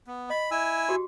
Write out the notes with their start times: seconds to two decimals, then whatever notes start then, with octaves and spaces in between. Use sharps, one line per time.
0.07 B3
0.30 D#5 B5
0.51 E4 G#5 E6
0.89 F#4 G4